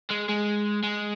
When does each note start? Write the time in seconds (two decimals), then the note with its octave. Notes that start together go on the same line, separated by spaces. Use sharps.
0.11 G#3
0.29 G#3
0.83 G#3